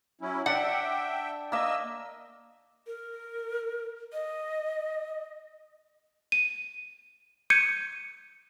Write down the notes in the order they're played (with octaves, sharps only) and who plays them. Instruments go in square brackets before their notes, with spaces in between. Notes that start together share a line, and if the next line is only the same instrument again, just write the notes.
[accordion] F#3 C#4 E4
[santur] D4 [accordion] E5 G5 [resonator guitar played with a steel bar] F#5
[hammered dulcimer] A#3 E5 [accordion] D#5 E6
[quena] A#4
D#5
[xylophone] D#7
G6 G#6 C#7 D#7